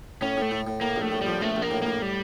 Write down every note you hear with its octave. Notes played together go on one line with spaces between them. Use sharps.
A2 C#4
A2 A3
A2
A2
A2 A#3
A#1
A3
A2
F3 G3
A#1 A3
A#1
A#3
A2
A2 A#3
G3